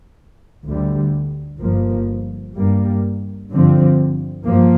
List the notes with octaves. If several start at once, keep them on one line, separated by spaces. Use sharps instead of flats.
D2 D3 G3
G1 G2 F3 A#3
G2 G3 A#3
G2 D3 F3 C4
G2 F3 A#3